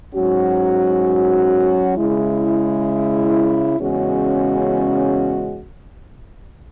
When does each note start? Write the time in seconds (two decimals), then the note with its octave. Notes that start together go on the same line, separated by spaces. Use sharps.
0.14 G#2 F#3 C#4 F#4
1.97 C#3 G#3 E4
3.80 E2 C#3 G#3 C#4 F#4